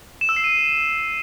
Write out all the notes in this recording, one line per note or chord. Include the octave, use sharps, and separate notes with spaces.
E7
E6
C7
D#7